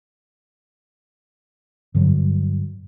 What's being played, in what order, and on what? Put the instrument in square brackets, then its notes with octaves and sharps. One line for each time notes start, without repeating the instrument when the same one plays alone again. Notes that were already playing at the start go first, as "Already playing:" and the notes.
[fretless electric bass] G2 D3 F#3 G3